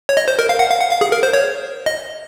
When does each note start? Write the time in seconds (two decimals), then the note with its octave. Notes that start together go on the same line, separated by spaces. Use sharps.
0.09 C#5
0.17 D#5
0.28 C5
0.39 A#4
0.49 F5
0.59 F#5
0.70 F5
0.80 F#5
0.91 F5
1.01 G#4
1.12 A#4
1.23 C5
1.33 C#5
1.86 D#5